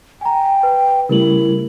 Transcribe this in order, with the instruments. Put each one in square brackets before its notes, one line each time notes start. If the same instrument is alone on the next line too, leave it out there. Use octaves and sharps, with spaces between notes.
[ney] G5 [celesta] G#5 A#5
[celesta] B4
[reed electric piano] C#3 G3 A3 [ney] E4 [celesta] A#4 F#7